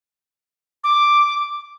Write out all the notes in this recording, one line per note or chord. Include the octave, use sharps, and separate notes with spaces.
D6